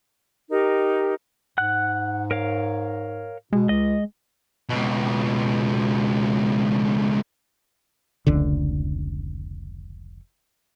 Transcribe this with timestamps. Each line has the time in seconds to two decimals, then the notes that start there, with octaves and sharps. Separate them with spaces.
0.50 D#4 G4 A#4
1.58 G#2 F#5 F#6
2.31 A#4 C#5 F5
3.53 B2 G#3
3.69 C#2 D#5
4.69 C#2 B2
8.27 F1 C#2 D3